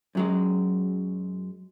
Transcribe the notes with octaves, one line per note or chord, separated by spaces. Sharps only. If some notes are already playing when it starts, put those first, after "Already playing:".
F#2 F#3 G#3